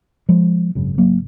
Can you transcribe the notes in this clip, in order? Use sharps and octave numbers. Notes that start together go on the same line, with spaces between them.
F3 G#3
G#1 F#2 C#3
F#3 A#3